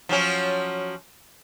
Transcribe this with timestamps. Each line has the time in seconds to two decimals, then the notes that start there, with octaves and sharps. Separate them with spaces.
0.09 F3 F#3 C#4